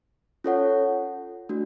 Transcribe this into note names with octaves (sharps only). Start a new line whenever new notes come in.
C#4 F4 A4 C#5 F#5
A3 D4 F#4